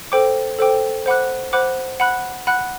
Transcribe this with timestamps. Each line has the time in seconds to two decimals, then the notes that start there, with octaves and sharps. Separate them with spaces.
0.12 A4 C5 G5 D6
0.59 A4 C5 G5 D6
1.06 C5 F#5 B5 D6 F#6
1.53 C5 F#5 B5 D6 F#6
2.00 F#5 B5 F#6
2.47 F#5 B5 F#6